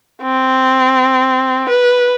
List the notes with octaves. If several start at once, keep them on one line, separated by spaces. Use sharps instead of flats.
C4
B4